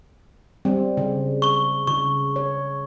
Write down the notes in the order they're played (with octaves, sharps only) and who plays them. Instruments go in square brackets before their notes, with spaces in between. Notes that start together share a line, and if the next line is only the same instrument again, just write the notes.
[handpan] G3 C4
C#3
[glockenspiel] C#6 G7
[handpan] C#3 [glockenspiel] C#6
[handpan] C#5